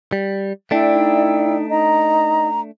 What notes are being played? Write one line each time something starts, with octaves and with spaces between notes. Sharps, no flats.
G3
A3 D4 E4 D5 G5
D#4
D#4 D#5 A#5